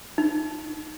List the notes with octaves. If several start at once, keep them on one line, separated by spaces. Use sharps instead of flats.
D#4